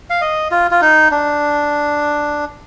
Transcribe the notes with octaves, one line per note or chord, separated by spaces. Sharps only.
F5
D#5
F4
F4
D#4
D4